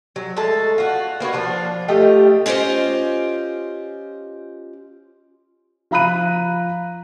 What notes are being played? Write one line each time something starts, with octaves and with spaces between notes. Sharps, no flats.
F#3
G#3 A3 A4 A5
F4 F#4
A#3 B3 F#4 C#5
F3 D4 F4
A3 F4 G4 D#5
C#4 F4 G4 C5 D#5
F3 F5 A#5 B5 F#6 D#7